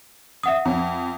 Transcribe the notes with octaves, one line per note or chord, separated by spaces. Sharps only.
E5 F#5 D#6
F2